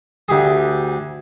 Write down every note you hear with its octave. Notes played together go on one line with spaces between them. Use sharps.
D2 G4 G#4